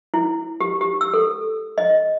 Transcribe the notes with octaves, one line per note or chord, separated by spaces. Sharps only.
E4
G4
G4
E6
A4
D#5